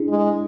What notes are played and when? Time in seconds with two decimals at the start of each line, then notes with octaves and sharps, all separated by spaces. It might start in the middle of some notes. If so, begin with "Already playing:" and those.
Already playing: D4 E4 G#4
0.09 G#3